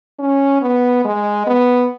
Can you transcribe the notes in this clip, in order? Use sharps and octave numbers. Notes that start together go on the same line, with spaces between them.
C#4
B3
G#3
B3